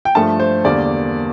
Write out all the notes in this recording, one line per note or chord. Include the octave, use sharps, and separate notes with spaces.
G5
G2 F3 A3 A5
C5
E2 D3 G3 A#3 D5